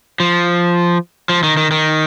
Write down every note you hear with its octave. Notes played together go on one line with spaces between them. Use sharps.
F3
F3
D#3
D#3
D#3